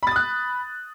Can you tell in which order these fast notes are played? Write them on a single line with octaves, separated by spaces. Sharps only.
B5 A6 D#6 F#6